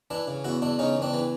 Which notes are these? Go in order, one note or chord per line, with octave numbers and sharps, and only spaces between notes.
E3 D4 E4
C#3
E2 E4 F#4
E2 D4 E4
C#3 C#4 D#4
E2
C4 D4
E3